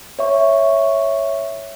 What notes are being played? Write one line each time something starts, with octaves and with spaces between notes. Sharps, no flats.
C#5 E5 C#6